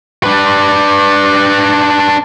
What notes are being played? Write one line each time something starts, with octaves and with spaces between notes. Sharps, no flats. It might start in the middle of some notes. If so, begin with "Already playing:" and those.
D4 B4